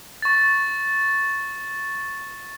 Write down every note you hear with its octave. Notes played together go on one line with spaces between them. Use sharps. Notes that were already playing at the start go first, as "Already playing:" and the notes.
C#6 A6